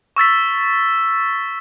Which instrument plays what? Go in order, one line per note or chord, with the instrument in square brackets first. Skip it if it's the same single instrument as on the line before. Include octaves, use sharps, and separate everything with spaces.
[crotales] C#6 E6 A6 B6